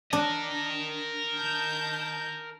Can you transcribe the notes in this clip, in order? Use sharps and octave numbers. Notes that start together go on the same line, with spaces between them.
D4 A#4 D#5
D#3 A5 G6